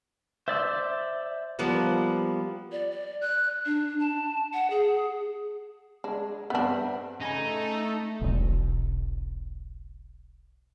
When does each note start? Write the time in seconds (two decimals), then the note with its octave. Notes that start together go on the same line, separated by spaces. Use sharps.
0.48 C5 D5 E5 E6
1.59 F3 G3 A#3 B3
2.72 D5
2.91 D5
3.21 F#6
3.66 D4
4.00 A5
4.54 F#5
4.70 G#4
6.04 G#3 D4
6.50 G2 B3 C4 D4 E5
7.21 C#3 A3 D#4 A4 G#5 B5
8.21 E1 B1